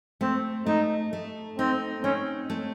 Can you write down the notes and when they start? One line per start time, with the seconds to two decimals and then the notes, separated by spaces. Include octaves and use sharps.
0.21 A3 C4
0.66 A3 D#4
1.13 A3
1.58 C4 D#4
2.04 C4 C#4
2.50 A3